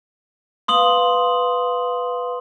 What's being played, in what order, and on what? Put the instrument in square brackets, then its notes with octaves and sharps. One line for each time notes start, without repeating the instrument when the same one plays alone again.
[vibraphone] B4 F5 [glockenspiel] C6 D#6 F#7